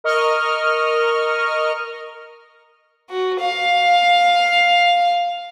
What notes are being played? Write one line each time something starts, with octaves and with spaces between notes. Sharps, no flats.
A#4 D#5 C#6 F6
F#4
F5